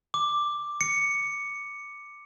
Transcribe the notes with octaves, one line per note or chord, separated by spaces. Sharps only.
D6
C#7